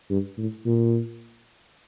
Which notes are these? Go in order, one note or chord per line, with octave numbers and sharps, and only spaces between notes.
G2
A2
A#2